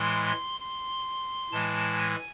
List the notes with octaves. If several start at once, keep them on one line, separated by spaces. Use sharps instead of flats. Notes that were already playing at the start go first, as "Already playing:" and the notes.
Already playing: A2 E3 G#3 C6
C6
A2 E3 G#3 A5
G#5